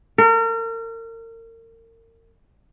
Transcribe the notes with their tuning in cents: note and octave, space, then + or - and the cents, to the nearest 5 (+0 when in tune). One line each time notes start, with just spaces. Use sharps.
A#4 -35